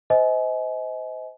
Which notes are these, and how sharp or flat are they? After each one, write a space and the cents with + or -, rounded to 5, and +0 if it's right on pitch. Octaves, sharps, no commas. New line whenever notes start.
C5 -25 D#5 +30 G#5 +35